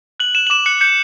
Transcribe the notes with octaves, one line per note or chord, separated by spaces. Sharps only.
F#6 F#7
F#6 E7
F#7
D6 E7
F#6 C#7
G6 C#7